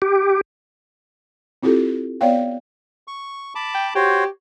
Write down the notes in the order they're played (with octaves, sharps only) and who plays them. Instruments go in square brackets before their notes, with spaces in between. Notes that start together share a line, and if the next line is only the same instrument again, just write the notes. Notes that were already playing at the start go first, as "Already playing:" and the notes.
[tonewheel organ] G4
[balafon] C4 E4 F4 G4 A4
B3 C#5 D5 F5 G5
[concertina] C#6
A5 B5 D6
[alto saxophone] G5
[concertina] F#4 C5 C#5 [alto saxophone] G4